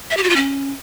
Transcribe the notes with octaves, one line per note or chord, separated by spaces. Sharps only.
E5
G4
F#4
F4
C#4